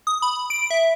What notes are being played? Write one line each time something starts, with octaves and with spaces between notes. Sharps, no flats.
D#6
B5
D7
E5